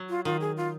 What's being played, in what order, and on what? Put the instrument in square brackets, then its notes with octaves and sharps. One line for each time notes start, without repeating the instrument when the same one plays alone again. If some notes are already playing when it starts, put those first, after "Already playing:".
Already playing: [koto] F#3
[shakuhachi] F4
[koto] D#3 [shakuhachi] F4
[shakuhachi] G#4
F4